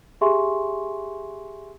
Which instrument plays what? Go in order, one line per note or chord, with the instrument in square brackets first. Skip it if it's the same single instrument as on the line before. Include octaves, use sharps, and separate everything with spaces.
[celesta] G4 G#4 E5 G#5 C6 C#6